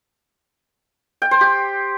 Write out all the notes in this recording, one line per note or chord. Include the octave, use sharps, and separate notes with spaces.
G5
C5
G4